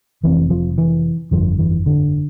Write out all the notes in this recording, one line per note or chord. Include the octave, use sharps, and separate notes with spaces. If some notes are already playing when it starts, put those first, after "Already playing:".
F1 F2 C3 E3
F3
E3
G1 F2 D3 F3
E3
D3